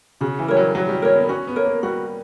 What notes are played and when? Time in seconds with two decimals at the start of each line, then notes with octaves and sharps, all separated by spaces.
0.21 C#3 F#4
0.39 E3
0.48 G3 A#4 C#5
0.57 F#3
0.75 F#3 F#4
0.89 G3
1.02 A#3 A#4 C#5
1.15 B3
1.29 C#4 F#4
1.47 B3
1.56 A#4 C#5
1.65 A#3
1.83 G3 F#4